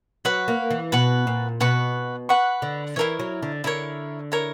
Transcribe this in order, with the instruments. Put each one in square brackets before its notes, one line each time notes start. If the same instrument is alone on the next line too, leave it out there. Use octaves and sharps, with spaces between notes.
[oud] F#3 [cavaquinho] B4 F#5 C#6
[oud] A#3
E3
[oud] B2 [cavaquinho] B4 F#5 C#6
[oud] A#2
[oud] B2 [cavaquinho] B4 F#5 C#6
[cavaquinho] B4 F#5 C#6
[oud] D3
[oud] E3 [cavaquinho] E4 A#4 C#5
[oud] F#3
D3
[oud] D3 [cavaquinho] E4 A#4 C#5
[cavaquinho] E4 A#4 C#5